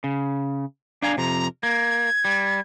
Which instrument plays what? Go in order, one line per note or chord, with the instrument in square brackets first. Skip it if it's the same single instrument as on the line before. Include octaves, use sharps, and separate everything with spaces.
[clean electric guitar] C#3
[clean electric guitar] D4 F5 G#5 [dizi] A#5
[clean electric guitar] F2 C3 [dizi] A#5
[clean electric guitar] A#3 [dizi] G#6
[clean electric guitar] G3